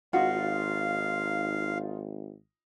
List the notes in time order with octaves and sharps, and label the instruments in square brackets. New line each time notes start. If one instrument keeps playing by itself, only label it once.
[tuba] G#1 [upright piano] D#4 F4 [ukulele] F#4 [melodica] F5